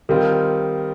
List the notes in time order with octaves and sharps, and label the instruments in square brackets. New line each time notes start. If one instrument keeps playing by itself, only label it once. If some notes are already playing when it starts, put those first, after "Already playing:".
[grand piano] D#3 G3 C4 F4 [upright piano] A#4